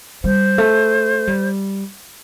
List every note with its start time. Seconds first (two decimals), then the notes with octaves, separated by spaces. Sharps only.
0.24 G3 C5
0.58 A3
1.27 G3